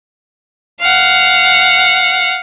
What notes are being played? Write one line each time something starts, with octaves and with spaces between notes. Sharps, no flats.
F5 F#5